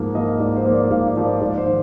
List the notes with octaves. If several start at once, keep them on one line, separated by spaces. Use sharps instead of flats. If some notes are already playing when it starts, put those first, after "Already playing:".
Already playing: G#2 F3 A#3
F3 A#3 D#5
G#2 D5
C5
F3 A#3
D5
G#2 F5
F5
F3 A#3
D5
G#2 D5
C5
D#3